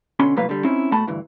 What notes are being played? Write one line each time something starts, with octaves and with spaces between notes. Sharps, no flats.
B2 D3 C#4 B5 C6
C2 A2 F#3 A#3 B4 F5
D3 G3
C4 C#4 D#4 E4
B2 A3 F#5 A5 B5
D2 G2 E3